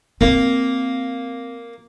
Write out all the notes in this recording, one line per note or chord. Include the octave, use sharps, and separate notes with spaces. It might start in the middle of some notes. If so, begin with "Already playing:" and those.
A#3 C4